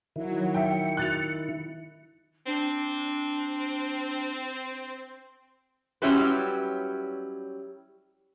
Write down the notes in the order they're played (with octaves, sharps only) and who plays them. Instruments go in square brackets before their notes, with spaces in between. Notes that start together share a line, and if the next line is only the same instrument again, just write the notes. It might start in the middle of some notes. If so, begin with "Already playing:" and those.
[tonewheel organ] D#3 E4 [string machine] F#3
[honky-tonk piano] E5 G5 [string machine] C#7
[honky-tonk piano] F#6 A6 F7
[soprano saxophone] C4 [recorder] D4
[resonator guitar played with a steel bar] F#3 G3 C#4 E4 G4 B4